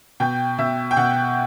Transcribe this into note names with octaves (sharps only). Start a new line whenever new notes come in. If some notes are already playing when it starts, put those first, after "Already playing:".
B2 G5
B2 E5
G5
B2 F#5